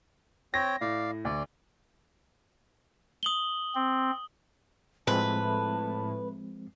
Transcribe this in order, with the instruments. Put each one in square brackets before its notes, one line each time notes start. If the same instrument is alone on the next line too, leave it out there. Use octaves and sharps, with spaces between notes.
[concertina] C4 C#5 G5 [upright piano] A#6
[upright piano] A2 [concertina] D5 F5
[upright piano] D2 [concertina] D5
[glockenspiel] D#6 F#7 G7
[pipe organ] C4
[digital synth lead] A2 [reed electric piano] F3 G#3 C4 [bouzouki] B4 [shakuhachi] A5